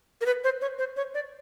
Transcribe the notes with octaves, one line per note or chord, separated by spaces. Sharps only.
A#4
B4
C5
C#5
C5
C#5
D5